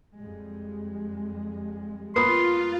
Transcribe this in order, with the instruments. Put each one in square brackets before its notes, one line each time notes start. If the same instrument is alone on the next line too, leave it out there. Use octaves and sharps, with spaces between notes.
[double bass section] F2 G3 G#3
[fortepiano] A#3 B3 D#6 [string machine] F4 [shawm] C6